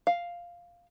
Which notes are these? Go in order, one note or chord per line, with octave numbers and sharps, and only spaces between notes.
F5